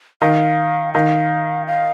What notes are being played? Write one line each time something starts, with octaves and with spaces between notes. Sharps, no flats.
D#3 F5
D#3 F5
F5